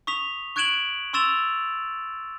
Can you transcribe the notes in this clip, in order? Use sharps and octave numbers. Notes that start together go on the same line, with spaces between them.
C#6 D#6 B6 F7
C#6 F#6 G#6 D7 E7 F#7
C6 C#6 E6 A6 E7 F7